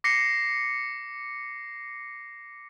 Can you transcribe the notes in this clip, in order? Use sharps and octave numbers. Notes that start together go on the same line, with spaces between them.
D6 A#6 C7 C#7